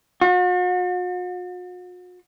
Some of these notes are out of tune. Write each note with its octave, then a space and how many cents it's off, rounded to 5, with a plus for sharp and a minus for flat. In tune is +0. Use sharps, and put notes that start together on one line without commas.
F#4 -45